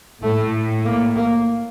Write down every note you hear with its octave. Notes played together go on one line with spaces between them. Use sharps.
A2 A3
A#3
A#3